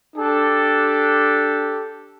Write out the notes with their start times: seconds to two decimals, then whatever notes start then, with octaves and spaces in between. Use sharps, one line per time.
0.17 D4 G4 A4